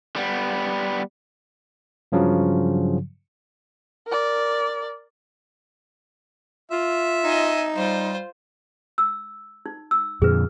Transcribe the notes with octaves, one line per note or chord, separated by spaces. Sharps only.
G3 B3
G2 C#3 F3 F#3
A#4 D5
F4 E5
D#4 D#5 G#5
G3 F4 C5
E6
D#4
E6
F2 A#2 D3 G#4 B4